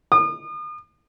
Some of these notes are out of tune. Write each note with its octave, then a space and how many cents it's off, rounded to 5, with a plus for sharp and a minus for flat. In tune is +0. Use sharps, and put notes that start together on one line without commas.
D#6 -40